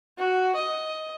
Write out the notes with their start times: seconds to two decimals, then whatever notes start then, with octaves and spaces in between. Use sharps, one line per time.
0.18 F#4
0.56 D#5